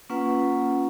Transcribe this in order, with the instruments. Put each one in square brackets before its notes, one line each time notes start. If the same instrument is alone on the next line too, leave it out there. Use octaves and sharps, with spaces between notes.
[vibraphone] A#3 C#4 F4 B4 F#5